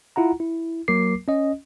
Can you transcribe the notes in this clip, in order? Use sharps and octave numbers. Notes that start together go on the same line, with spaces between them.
E4 F4 F#5 A#5
E4
F#3 A#3 A#4 D6 C7
C#4 D#5